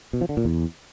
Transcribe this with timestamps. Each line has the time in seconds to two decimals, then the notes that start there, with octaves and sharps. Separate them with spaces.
0.13 B2
0.21 F3
0.29 D3
0.37 A#2
0.45 E2